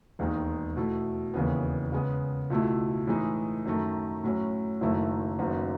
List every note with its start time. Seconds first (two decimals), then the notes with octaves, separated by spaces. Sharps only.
0.19 E1 D#2 D#3 G#3 D#4
0.77 B2 A3 E4
1.34 E1 D#2 C#3 E3 B3
1.92 C#3 G#3 B3
2.50 C#2 B2 A3 E4
3.07 A2 E3 G#3 D#4
3.65 F#2 D#3 A3
4.24 A2 F#3 C#4
4.81 F#1 F#2 D#3 A3 E4
5.39 F#1 F#2 D#3 F#3 B3